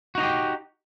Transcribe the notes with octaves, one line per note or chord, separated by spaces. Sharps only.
D#4 F#4 G4 D#5